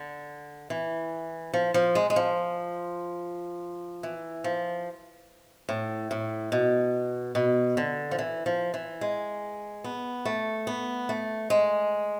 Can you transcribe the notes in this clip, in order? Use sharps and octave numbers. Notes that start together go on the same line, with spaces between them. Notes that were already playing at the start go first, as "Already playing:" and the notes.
Already playing: D3
E3
F3
F3
G#3
G#3
F3
E3
F3
A2
A2
B2
B2
D3
F3
E3
F3
E3
G#3
B3
A3
B3
A3
G#3